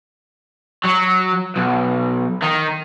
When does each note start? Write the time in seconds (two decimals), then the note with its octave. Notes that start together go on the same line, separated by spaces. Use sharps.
0.85 F#3
1.56 B1
2.42 D#3